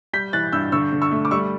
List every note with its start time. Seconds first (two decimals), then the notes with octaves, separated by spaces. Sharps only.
0.13 G3 G6 B6
0.33 E3 F#6 A6
0.52 G2 E6 G6
0.72 D3 C#6 E6
0.92 D3
1.02 C#6 E6
1.11 A3
1.25 D6
1.31 G3 C#6 E6